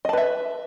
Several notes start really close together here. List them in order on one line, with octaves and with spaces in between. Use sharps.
D#5 A5 B4 E5